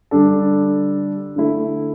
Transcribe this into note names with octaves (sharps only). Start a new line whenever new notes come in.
D3 G3 D4 A4
D3 A3 E4